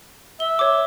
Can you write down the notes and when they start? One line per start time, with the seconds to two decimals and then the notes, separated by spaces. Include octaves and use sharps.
0.40 E5 G7
0.59 C#5 D6